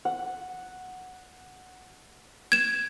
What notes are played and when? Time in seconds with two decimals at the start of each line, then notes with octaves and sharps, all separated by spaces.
0.05 F#5
2.52 G#6 E7